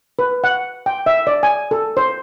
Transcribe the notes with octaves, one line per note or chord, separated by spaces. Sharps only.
B4
F#5
G5
E5
D5
G#5
A4
C5